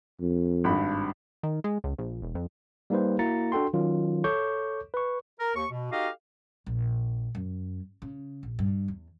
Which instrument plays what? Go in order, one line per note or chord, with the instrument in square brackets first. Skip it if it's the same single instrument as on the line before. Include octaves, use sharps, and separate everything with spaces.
[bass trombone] F2
[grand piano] G#1 G2 B5
[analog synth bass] D#3
G#3
C#2
A#1
E1
F2
[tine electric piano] G3 A#3 D#4 G4 B4 C5
A#3 E4 F#4 A#5 A6 C#7
D4 F#4 A4 G5 C6
D#3 F#3 C#4 F4
A4 C#5 C#6 D6 G6
B4 C#6
[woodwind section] A#4
D#2 C#6
B2
D#4 F#4 G4 A4 D#5 F5
[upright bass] A#1
F#2
C#3
A#1
G2
E2